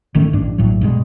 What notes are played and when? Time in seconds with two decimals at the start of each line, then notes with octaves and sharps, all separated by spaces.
0.15 G1 D#3 A3 C#4
0.33 A1 G2 D4
0.58 A#1 A2 F#3
0.81 G2 B2 G#3